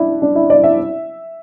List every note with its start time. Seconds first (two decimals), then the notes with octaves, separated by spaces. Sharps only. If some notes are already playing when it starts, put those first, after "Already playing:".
Already playing: D4 E4
0.22 D4
0.35 E4
0.50 D5
0.64 E5